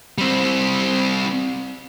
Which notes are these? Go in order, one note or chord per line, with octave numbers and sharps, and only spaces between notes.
G3 C4